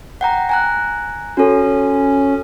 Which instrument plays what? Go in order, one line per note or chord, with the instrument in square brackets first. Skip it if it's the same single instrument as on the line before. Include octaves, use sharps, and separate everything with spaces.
[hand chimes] F#5 G5 A#5
G#5 A#5 F#6
[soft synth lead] C#4 [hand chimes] F#4 A4